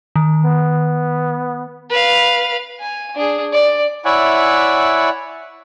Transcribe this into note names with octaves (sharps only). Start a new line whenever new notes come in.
D#3
B3
B4 F5
G#5
D4 G#4
D5
E4 C#5 D5 E5 F#5 G#5